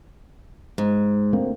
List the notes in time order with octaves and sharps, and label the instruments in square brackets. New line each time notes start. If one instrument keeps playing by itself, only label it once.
[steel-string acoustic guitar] G#2
[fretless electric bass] D2 A#3 C4